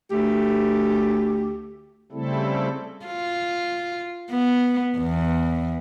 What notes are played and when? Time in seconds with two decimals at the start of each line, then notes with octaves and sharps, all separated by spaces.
0.11 D2 A3 G4
2.12 C#3 G3 A3 C4 E4 A4
3.06 F4
4.31 B3
4.98 E2